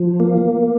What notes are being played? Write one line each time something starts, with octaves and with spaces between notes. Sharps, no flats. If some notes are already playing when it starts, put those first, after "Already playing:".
Already playing: F3
A#3